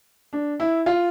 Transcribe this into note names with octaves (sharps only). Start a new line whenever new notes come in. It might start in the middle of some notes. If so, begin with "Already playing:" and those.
D4
E4
F4